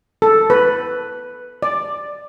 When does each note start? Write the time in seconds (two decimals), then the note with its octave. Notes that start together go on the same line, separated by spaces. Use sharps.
0.22 A4
0.50 B4
1.62 D5